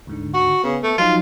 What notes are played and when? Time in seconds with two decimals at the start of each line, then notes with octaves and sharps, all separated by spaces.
0.07 D2 G#2 D3
0.34 F#4
0.63 C#3 B3
0.83 A3
0.98 F3 F#3 D#4 F4